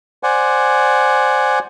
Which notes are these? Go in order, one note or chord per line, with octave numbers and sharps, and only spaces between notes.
C5 D5 F#5 G#5